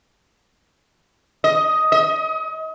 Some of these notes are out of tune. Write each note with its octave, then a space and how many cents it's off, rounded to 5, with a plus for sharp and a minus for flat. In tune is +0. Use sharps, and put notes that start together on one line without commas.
D#5 +10
D#5 +35